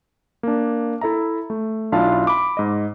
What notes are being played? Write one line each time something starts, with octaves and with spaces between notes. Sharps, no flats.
A#3 D4
E4 A4 E5 A#5
A3
B1 D4 E4 F4 F5 A5
B5 D6
G#2 D#5